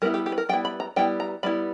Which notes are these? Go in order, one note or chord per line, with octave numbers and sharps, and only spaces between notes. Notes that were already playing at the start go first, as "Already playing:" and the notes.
G3 B3 E4 A#4
G4
G4
B4
A#4
G3 B3 E4 G5
B5
A#5
G3 B3 E4 G5
A#5
G3 B3 E4 B5